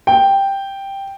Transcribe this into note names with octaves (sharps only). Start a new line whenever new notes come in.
G5